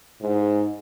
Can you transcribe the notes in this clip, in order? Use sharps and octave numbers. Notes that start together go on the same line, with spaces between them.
G#2